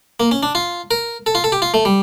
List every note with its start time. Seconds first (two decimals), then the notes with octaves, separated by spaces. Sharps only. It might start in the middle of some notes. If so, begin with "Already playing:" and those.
0.20 A#3
0.31 C#4
0.43 D4
0.55 F4
0.91 A#4
1.26 A4
1.35 F4
1.44 A4
1.52 G4
1.62 F4
1.74 A3
1.85 G3